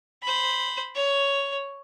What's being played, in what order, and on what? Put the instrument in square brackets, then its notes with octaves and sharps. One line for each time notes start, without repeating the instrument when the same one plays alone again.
[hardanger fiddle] C5 B5
C#5